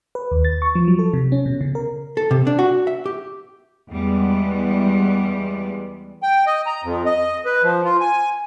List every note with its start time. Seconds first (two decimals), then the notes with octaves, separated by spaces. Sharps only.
0.15 B4
0.31 D#2
0.45 A6
0.62 C#6
0.75 F3
0.88 F#3
0.99 A4
1.13 C3
1.32 C#4
1.46 B2
1.61 C#3
1.75 A#4
2.17 A4
2.31 C3
2.47 D4
2.59 F#4
2.87 E5
3.06 G4
3.91 E2 G3 G#3 B3
6.23 G5
6.46 D#5
6.66 A#5
6.84 F2
7.06 D#5
7.45 B4
7.63 F3
7.85 F4
8.00 G#5